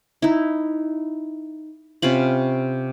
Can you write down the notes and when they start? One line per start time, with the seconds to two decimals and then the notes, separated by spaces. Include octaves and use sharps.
0.22 D#4 E4
2.02 C3 C#4 F4 B5